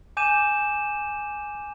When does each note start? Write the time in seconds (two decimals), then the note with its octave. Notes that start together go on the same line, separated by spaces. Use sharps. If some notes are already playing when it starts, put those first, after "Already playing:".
0.17 G#5 D6 G6 D#7 E7